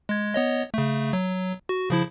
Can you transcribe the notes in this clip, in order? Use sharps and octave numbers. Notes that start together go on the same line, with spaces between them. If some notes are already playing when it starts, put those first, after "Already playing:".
G#3 G#6
B3 C#5 D#5
C#3 A3
F#3
F#4
C#3 F3 E4